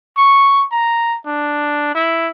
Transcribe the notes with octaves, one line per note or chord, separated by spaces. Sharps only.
C#6
A#5
D4
E4